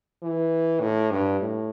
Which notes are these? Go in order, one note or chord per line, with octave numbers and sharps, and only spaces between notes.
E3
A2
G2
A2